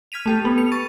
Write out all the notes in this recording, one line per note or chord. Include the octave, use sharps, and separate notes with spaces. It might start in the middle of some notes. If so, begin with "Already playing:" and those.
F6 G#6 B6 D#7 F7
A3 G4 A4
B3
C#7 F7
C#6 A6 D#7